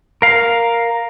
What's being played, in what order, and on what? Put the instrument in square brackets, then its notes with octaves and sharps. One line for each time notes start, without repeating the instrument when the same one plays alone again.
[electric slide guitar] A#4 F5